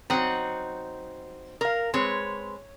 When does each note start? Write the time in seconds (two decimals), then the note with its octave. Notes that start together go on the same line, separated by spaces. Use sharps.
0.10 F#3 C4 D#4 F#5
1.61 A#4 F5
1.94 G#3 C4 B4 C#5